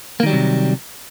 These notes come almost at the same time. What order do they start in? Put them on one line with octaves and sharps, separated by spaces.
A#3 D#3 G3 F#3 C3